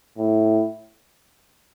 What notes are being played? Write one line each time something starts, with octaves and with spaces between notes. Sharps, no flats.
A2